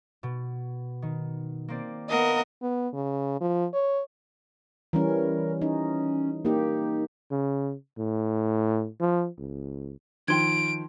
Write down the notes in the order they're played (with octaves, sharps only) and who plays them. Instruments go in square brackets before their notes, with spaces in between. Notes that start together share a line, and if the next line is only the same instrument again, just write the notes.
[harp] B2
D#3
A#3 C4 D5
[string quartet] B3 A#4 D#5 [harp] F5 F#5 B6
[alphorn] B3
C#3
F3
C#5
[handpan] E3 G3 C#4 [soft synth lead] A#4
[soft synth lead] C#4 [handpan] D#4
[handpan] A#3 G4 [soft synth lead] D#4
[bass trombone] C#3
A2
F3
C#2
[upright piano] D#3 F3 [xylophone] G5 C6 G#6 [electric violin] D7